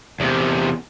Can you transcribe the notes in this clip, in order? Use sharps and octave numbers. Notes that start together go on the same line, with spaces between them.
E2 C3